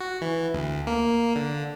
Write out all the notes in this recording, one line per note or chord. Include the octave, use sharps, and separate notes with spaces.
F#4
E3
D2
A#3
D3